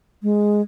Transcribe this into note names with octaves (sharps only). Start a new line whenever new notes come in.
G#3